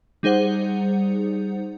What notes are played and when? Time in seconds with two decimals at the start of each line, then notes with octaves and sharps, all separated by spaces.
0.23 G3 D#4 G#4 C5 F#5